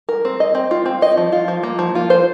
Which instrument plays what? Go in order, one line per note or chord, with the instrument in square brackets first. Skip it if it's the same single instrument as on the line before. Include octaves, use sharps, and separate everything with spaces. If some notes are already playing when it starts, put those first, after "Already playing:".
[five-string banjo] A#4
C4
D#5
C4
F4
C4
D#5
F3
F4
F3
A#3
F3
F4
C5